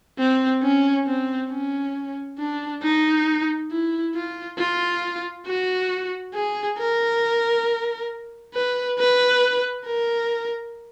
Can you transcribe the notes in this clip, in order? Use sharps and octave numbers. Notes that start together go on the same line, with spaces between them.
C4
C#4
C4
C#4
D4
D#4
E4
F4
F4
F#4
G#4
A#4
B4
B4
A#4